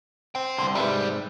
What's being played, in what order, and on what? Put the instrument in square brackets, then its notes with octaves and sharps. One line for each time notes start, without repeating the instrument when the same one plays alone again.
[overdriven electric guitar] C5 G5
[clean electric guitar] C2 D3 [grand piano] C6
[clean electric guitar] G#2 C3 [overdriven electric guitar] G3 [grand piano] B4 E5 B5